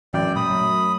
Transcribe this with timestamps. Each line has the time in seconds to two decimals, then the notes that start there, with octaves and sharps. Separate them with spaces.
0.14 F#2 E3 G#3 D5 G5
0.36 A#2 G#3 B5 D#6
0.50 F#3 G3 A3